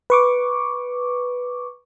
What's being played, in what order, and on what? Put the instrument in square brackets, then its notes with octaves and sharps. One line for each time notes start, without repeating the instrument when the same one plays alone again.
[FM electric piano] B4 C#6 D6